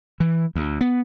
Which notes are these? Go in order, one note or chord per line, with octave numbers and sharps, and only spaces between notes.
E3
D2
B3